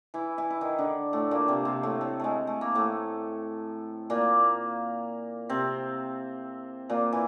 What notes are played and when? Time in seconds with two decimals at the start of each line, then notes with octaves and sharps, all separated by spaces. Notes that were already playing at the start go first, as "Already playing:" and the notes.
0.14 E3 E4
0.38 E3 E4
0.50 E4
0.61 D#3 D#4
0.78 D3 D4
1.13 A2 A3
1.31 A#2 A#3
1.48 C3 C4
1.65 C3 C4
1.83 A2 A3
2.01 A2 A3
2.20 G#3 A3
2.47 A3
2.61 A#3
2.75 A2 A3
4.10 A#2 A#3
5.49 C3 C4
6.89 A#2 A#3
7.12 E3